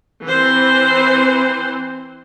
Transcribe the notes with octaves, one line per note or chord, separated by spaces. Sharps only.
E3 C4 C5